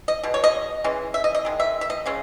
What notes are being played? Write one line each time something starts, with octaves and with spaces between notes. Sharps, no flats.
D#5
B2 G#3
C#5
D#5
E3 G#3 C#4
E5
D#5
D#5
D#3 G#3
E5
E5
D#5
C#3 G#3 C#4